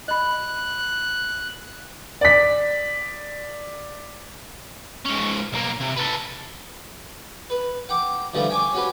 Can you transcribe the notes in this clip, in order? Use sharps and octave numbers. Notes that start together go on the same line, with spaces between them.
D#5 B5 F#6
D5 B6
G#2 C#4
B1 A#3
C3
A4 B4
B4
F#5 G5 D6
D3 E3 F3 G3 A3
G5 G#5 C#6 D6
C#4 F#4 G4 B4